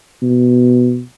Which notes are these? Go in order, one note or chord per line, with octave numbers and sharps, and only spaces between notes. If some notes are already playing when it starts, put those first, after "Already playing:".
B2